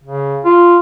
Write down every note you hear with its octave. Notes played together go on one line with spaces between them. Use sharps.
C#3
F4